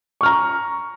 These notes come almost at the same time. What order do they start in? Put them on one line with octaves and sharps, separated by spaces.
C#6 F6 A#5